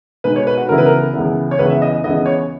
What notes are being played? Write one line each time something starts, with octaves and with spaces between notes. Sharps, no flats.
B2 G#3 D#4 B4
C#5
B4
F#4
C#2 C#3 E3 B3 E4 A#4
B4
A#4
C#2 C#3 E3 B3 E4
C#5
C#2 C#3 E3 B3 E4 B4
E5
D#5
C#2 C#3 E3 B3 E4 D#5
C#5